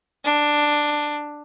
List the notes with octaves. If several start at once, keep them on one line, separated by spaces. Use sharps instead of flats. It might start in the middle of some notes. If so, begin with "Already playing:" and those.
D4